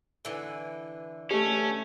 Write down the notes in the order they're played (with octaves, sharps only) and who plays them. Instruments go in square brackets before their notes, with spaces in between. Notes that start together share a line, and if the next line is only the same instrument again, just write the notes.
[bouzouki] D3 E3 G#5
[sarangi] A3 [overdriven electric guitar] C#4 [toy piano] G4